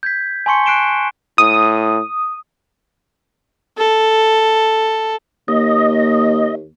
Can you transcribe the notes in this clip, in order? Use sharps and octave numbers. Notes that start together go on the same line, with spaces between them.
G6 G#6 B6
G#5 A5 C6 C#6 C#7
F#6 C7 D7 E7 G7
A2 D#6
A4
D#2 A#3 D#5